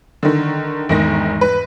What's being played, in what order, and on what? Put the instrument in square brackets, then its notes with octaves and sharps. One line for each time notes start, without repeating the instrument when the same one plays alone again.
[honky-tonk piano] D3 D#3
[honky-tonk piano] G1 D#3 A#6 [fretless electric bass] E2 G#2
[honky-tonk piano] B4